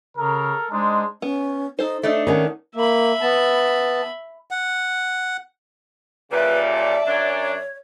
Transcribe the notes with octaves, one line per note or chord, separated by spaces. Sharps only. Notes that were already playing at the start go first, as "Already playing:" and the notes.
C#3 A4 A#4
G#3 D4 D#4 C5
B3 C#4
D#4 A4 C5
A3 D4 D#4 E5
D#3 C#4 F#5
A#3 E5 B5
B3 A5
F#5
A#2 C#3 G3 B4 D5 E5
A5
F#2 D4 C#5